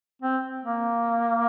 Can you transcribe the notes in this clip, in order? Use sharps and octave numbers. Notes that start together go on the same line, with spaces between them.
C4
A#3